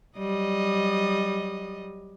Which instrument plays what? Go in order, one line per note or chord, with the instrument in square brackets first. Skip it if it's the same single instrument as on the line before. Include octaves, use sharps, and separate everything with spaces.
[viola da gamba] F#3 G3 D#5